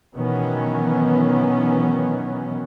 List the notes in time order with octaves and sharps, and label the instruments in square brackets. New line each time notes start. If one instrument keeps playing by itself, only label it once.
[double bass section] B2 D#3 E3 F#3 B3 C#4